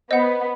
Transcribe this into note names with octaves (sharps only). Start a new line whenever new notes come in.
B3 C5 D#5 F#5